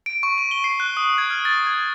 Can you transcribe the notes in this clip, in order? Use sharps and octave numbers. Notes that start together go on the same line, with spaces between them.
D7
C#6
D#7
G7
C7
F#6
D#6
G#6
F6
A6
G#6